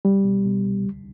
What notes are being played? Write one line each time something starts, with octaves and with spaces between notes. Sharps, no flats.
C2 G3
B2
B2
C2
D2